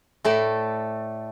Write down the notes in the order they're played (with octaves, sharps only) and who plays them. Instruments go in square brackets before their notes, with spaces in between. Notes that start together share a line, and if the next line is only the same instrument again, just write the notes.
[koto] A2 A3 A4 D5